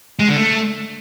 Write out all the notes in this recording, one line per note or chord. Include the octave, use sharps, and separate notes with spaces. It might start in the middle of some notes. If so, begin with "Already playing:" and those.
G#3
D3
A3